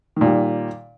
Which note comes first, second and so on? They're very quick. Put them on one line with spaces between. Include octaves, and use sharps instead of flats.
D#3 A#2 G3